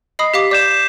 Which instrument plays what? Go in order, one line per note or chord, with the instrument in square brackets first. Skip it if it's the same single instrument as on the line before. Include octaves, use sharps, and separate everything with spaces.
[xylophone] D#5 B5 D#6 [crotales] C7
[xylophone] G4 F5 D6 [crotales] B6
[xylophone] D5 [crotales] D6 G6 E7